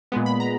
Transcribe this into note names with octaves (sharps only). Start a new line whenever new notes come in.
A#2 G#3 B3
B5
A#5